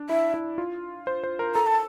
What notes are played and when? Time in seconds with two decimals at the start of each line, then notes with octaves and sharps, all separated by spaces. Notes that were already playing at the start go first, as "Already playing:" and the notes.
Already playing: D4
0.09 E4 E5
0.34 E4
0.58 F4
1.07 C5
1.24 C5
1.39 A#4
1.55 A4 A#5
1.67 A5